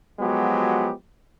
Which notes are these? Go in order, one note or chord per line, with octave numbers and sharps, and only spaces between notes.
F3 F#3 G#3 B3 F#4 G4